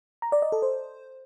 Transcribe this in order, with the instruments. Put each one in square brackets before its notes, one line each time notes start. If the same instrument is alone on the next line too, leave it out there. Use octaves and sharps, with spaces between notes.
[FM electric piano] A#5
D5
D#5
A4
C5